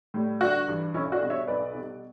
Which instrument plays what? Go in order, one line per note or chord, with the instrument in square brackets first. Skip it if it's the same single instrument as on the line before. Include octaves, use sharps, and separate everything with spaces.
[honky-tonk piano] A2 G3
G1 D4 F#4
G2 E3
B1 C#4 E4
D4 F#4
B2 G3
C#5 E5
B1 B4 D5
B2 G3